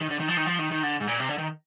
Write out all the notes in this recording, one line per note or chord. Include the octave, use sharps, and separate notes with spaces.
D#3
D3
D#3
F3
D#3
F3
D#3
D#3
D3
G#2
A#2
C3
D3
D#3